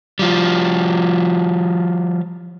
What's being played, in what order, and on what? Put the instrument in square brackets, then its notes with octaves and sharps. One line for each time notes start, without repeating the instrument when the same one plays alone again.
[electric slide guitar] F3 G3